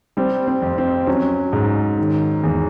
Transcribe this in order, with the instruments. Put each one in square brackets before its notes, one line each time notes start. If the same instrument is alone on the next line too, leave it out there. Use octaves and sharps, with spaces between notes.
[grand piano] G3 C4
C4
F2
C4
F#3 C#4
G#2
D#3
E2